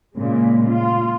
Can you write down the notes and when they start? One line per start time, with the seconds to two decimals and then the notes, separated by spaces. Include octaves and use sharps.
0.15 A#2 C#3 G#3
0.68 F4